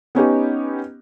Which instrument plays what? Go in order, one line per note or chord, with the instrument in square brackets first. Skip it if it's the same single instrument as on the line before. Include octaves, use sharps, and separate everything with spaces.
[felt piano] B3 C#4 D#4 G4